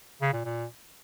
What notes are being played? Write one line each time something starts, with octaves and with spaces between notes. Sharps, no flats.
C#3
A#2
A#2